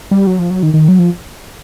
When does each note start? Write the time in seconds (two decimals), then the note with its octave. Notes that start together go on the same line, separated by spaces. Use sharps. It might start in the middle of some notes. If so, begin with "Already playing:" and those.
0.11 G3
0.27 F#3
0.39 F3
0.50 F#3
0.63 D#3
0.74 D#3
0.88 F#3
0.99 F3